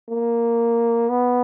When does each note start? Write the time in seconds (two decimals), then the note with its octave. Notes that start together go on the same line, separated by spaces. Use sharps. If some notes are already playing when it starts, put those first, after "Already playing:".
0.10 A#3
1.09 B3